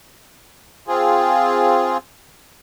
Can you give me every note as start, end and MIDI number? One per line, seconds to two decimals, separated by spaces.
0.88 1.97 60
0.88 1.97 65
0.88 1.97 68